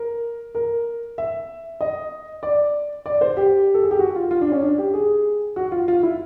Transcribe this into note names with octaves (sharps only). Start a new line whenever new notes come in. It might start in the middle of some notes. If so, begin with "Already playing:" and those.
Already playing: A#4
A#4
E5
D#5
D5
D5
C5
G4
A4
G#4
G4
F#4
F4
F4
D4
C#4
D4
G4
G#4
F#4
F4
F4
E4